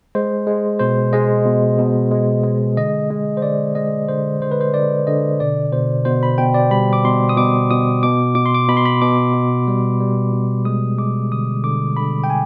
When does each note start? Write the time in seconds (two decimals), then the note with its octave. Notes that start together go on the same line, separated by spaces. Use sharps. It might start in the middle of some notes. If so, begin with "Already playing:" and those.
0.15 G#3 C5
0.47 G#3
0.80 B2 C5
1.13 G#3 D#5
1.46 B2
1.78 B2
2.11 G#3
2.44 G#3
2.77 D3 D#5
3.10 G#3
3.37 C5
3.42 D3 D5
3.75 G#3 D#5
4.09 D3 C5
4.41 D3 C5
4.52 B4
4.61 C5
4.74 D3 D5
5.07 D3 D#5
5.40 B2 D5
5.72 B2 C5
6.05 B2 C5
6.23 B5
6.38 B2 G5
6.54 D5
6.71 G3 B5
6.93 D6
7.04 B2 C6
7.29 D#6
7.37 B2 D6
7.71 B2 D#6
8.03 B2 D6
8.35 B2 D6
8.46 C6
8.54 D6
8.69 B2 B5
8.77 C6
8.85 B5
9.01 B2 D6
9.34 B2
9.68 G3
10.00 G3
10.33 B2
10.65 G#3 D#6
10.98 G#3 D6
11.32 D3 D#6
11.64 D3 D6
11.97 D3 B5
12.24 G5
12.30 G#5